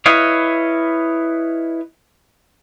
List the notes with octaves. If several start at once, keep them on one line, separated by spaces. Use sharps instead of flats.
E4 B4 C#5 D#5 F5